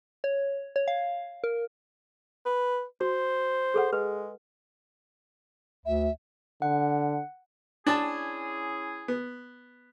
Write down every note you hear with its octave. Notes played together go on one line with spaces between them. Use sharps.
C#5
C#5
F5
A#4
B4
F#4 C5
G#4 A4 F#5
G#3 B4
D2 E5
D3 F#5
C#4 D4 E4 G#4 A5
B3